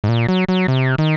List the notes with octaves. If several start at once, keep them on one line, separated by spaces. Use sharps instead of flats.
G#2
A#2
F#3
F#3
C3
D#3